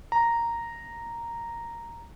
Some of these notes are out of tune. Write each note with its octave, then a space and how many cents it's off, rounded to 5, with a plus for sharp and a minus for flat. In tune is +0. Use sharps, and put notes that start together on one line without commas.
A#5 -5